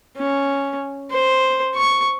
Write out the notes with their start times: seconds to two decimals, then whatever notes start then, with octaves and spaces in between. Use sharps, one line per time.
0.17 C#4
1.10 C5
1.75 C#6